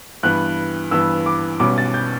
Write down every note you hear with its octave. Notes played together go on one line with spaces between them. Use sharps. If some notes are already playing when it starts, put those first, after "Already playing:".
G2 E3 B3 F#6
G2 E3 B3 E6
D6
B1 B2 G3 C#4 D6
A6
G6